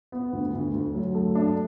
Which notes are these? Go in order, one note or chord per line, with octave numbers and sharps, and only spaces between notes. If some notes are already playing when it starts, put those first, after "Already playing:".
B3
D2
D2
D2
F#3
A3
D4